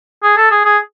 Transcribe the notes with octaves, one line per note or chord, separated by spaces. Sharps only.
G#4
A4
G#4
G#4